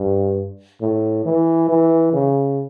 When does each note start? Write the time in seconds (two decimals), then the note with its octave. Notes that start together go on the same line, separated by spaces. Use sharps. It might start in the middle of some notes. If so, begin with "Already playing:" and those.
Already playing: G2
0.81 A2
1.25 E3
1.69 E3
2.13 C#3